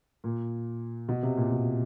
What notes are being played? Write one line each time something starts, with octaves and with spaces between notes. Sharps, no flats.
A#2
B2
C3
A#2
B2